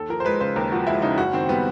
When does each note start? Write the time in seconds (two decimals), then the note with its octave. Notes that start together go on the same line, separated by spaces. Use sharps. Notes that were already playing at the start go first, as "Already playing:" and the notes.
Already playing: D#2 A4
0.09 F3 A#4
0.20 C5
0.25 G#3 B4
0.41 C#3 C5
0.56 D#2 A#4
0.72 F3 F#4
0.87 G#3 E4
1.02 C#3 D#4
1.18 F#1 F#4
1.33 D#3 C4
1.49 G3 B3